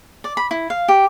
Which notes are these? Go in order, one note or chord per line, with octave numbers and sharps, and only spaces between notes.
D5
B5
E4
F5
G4